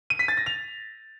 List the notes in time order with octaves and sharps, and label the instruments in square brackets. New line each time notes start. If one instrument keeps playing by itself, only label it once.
[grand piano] D#7
B6
A6
A#6
F7